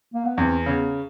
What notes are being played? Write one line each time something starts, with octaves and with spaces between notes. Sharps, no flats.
A#3
B3
E2 C4
C#3 B3